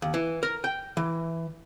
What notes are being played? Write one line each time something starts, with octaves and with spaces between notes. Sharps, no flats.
D#2
E3
A#4
G5
E3